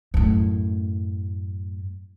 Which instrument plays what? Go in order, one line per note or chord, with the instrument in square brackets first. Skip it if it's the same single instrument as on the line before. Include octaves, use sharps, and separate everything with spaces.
[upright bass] F#2 A2